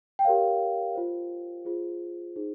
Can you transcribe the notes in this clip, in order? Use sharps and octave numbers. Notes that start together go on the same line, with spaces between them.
G5
G4 A#4 C#5 F5
F4 C5
F4 G#4 C5
D#4 G#4 C5